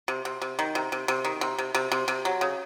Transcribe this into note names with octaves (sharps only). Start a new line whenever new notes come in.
C3
C3
C3
D#3
C3
C3
C3
D#3
C3
C3
C3
C3
C3
F#3
C#3